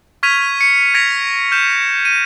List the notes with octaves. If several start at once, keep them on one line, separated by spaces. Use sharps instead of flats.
C#6 F6 G#6 B6 D#7 F7
C#7
G#6 A#6 B6 D7 F7
F6 G6 E7
D#7